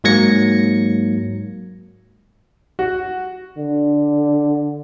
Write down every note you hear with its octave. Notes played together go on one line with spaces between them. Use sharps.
G#2 F#3 A#3 G#6 A#6 C#7
F#4
D3